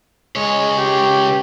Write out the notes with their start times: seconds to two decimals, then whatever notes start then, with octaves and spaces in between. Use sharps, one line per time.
0.36 C#2 G#3 C#5
0.77 G4